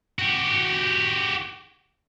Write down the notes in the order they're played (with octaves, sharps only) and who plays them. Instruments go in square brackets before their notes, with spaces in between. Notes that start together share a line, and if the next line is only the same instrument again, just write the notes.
[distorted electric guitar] F#4 G4